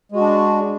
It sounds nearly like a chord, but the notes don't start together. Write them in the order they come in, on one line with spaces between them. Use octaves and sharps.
G#3 F#4 D4